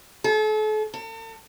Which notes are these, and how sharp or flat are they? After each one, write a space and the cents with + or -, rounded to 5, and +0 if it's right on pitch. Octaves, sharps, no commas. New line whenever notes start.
A4 -40
A4 +40